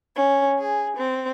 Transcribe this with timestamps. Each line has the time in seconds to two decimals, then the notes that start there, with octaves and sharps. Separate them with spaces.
0.15 C#4
0.59 G#4
0.97 C4